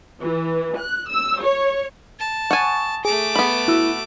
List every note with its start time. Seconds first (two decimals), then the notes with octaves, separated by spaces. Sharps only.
0.22 E3
0.78 F#6
1.09 E6
1.41 C#5
2.19 A5
2.51 F#5 G#5 C#6 D#6 A6
3.05 A3 G#4 D6
3.36 B3 B5
3.68 E4 F#4 E6